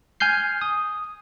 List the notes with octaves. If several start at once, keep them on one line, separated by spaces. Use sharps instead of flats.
G#5 F6 G6 C7
D#6